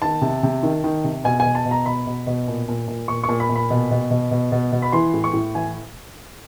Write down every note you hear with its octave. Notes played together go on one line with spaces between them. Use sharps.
D#3 A5
C3
C3
D#3
D#3
C3
B2 G#5
G#5
B2
A5
B2
A#5
B2 B5
B2
B2
A#2
A#2
A#2
A#2 C#6
C#6
A#2
B5
A#2
B5
B2
B2
B2
B2
B2
B2
B5
E3 C6
A2
C#6
A2
E3 G#5